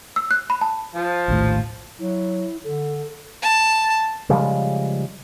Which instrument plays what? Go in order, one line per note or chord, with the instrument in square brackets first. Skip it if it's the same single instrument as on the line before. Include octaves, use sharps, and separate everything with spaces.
[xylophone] E6
F#6
B5
A5
[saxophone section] F3
[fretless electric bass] A#1 D#2 A2
[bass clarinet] F#3 [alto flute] E4
[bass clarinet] D3 [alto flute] A4
[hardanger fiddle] A5
[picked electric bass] C#3 F3 G3 G#3